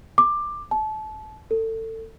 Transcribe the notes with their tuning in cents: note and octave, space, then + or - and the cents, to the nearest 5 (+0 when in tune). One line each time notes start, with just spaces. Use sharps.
D6 +15
A5 -30
A4 +25